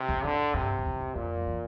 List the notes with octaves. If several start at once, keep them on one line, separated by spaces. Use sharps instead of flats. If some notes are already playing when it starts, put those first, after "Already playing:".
Already playing: C3
F2
A2 D3
G2 C3
F2
E2
F2
F2 A#2
F3
E3